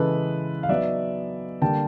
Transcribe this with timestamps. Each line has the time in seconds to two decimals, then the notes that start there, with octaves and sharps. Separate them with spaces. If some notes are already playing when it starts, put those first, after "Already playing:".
Already playing: C#3 E3 G#3 A4 B4
0.63 F5
0.69 F#3 B3 D#4 D5 E5
1.62 D3 G3 A#3 G5 A5